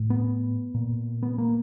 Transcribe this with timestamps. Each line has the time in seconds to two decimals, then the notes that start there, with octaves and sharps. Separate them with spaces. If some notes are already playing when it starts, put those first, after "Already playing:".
Already playing: A2
0.10 B3
0.74 A#2
1.23 B3
1.38 A#3